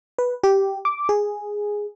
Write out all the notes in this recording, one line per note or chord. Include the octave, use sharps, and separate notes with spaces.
B4
G4
D6
G#4